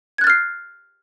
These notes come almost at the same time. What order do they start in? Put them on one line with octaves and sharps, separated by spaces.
G#6 F#6 A6 F6 C7